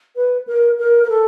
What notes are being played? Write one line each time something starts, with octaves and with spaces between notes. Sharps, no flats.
B4
A#4
A#4
A#4
A4